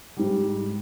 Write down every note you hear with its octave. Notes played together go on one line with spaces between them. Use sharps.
G#2 G3